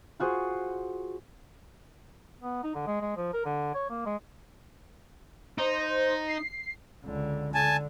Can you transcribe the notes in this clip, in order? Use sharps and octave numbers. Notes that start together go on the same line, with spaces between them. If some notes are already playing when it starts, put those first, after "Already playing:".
F4 F#4 G#4 C5
B3
D#4
D3
G#3
G#3
F3
A#4
D3
C#5
A#3
G#3
D#4 C5
C7
C#2 D3
D3 G#5 A5